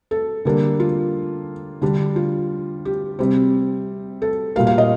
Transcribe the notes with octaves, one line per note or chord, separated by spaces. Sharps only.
A4
D3 G3 A#3 D4
F4
D3 G3 D4
F4
G4
C3 G3 C4
A4
A#2 G3 A#3 F5
F5
D#5